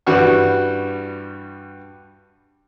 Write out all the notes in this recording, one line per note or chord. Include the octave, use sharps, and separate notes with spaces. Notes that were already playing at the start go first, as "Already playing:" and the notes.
G2 E3 G3 F#4 C#6